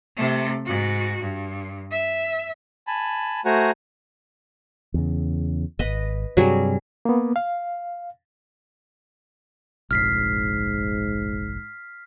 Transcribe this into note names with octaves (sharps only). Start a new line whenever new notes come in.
C3 A3
G#2 F#4
G2
E5
G#5 A5 B5
A3 F#4 C5 F#5 G#5 A#5
E2 C#3
D1 G#1 B4 D#5
G2 C3 F#3 G3 G#4
A#3 B3
F5
F1 A#1 G#2 F6 B6 C7